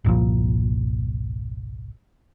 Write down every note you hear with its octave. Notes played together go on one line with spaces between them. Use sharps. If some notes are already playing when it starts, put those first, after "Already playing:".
G1 C2 A#2 F3